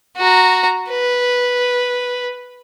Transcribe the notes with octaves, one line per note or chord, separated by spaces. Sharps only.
F#4 A#5
B4